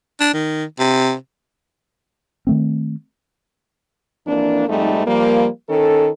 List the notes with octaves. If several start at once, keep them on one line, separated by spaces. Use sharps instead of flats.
D4
D#3
C3
D#3 A3 C4
F2 E3 A#3 D4
F2 G#2 G3 A3 D#4
F3 G3 A#3
D#3 C#4 A4